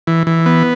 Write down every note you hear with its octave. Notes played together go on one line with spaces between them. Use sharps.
E3
E3
B3